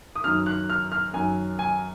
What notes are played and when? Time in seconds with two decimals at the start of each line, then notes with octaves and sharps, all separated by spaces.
0.15 D#6
0.24 F#2 D#3 F6
0.46 F#6
0.70 F6
0.92 F6
1.14 F#2 D#3 G#5
1.59 G#5